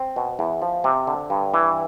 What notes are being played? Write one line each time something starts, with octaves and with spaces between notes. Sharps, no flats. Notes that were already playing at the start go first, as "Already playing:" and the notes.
Already playing: C4
B2
E2
F3
C3
D3
G2
E3